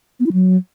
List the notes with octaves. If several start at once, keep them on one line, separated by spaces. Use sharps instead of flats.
B3
E4
F#3